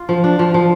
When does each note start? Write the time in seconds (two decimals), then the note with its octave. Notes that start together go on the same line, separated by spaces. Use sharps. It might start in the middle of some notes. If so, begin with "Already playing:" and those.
Already playing: F4
0.09 F3
0.24 D4
0.39 F3
0.54 F3